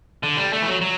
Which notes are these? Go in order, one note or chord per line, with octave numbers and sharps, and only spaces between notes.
D3
G3
A3
E3
F#3
F#3